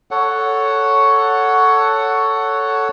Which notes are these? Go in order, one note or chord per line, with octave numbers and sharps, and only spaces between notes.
A4 C#5 F#5